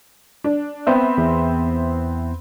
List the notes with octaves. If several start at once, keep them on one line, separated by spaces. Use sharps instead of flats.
D4
B3 C4 E5
E2